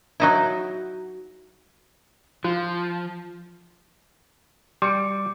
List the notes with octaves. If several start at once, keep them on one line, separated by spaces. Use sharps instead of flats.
F#3 D#4 E4
F3 F4
G3 C6 D6 C#7 D7